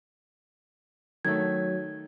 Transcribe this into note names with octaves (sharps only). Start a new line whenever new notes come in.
D#3 F#3 A3 G#6